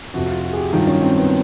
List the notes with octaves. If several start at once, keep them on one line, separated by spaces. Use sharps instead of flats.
F2 C3 F3 F#4
F4
F#4
G#4
G4
G2 D#3 F#3 F4
C#4
C4
B3